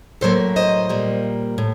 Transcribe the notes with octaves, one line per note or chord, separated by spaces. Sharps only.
A2 F#3 A#3 A4 C5
C5 D#5
A#2 G3 A#3
A2